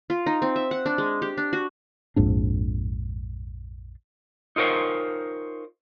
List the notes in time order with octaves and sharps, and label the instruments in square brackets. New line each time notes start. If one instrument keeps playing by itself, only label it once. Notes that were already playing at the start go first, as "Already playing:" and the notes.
[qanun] F4
D#4
C4
E5
F#5
D4
G#3
G4
D4
F#4
[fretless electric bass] A#1 F2 G#2 D4
[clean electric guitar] D#4 F4 A#4 C5 C#5